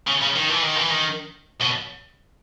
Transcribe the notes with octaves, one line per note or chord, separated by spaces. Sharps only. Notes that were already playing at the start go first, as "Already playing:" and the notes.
C#3
C#3
D#3
E3
D#3
E3
D#3
B2